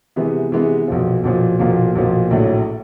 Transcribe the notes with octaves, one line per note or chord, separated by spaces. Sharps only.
C3 E3 G#3 B3
C3 E3 G#3 B3
B1 A#2 F3
B1 A#2 F3
B1 A#2 F3 A#3
B1 A#2 F3 A#3
A#1 A2 F#3